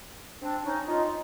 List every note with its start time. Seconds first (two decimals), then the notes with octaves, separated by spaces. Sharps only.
0.42 C4 D4
0.64 C#4 D#4
0.87 D#4 F4